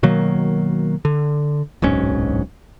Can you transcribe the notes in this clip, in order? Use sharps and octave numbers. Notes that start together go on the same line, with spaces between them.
B2 D#3 F#3 A#3
D3
D1 B1 G#2 C#4